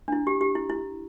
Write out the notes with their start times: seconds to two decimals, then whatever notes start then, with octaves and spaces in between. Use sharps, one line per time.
0.08 D4
0.12 E4
0.27 G4
0.41 G4
0.55 E4
0.70 E4